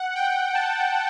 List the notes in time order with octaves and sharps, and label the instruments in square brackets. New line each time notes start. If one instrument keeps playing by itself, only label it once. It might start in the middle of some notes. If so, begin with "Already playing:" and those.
Already playing: [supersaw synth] F#5
G5
A5